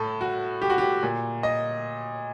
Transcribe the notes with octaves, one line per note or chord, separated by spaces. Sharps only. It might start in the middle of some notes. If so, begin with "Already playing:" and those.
Already playing: A2 A4
F#4
G4
F#4
G4
A#2
D#5